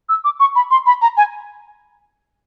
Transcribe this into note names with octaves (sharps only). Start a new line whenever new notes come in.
E6
D6
C#6
B5
C6
B5
A#5
G#5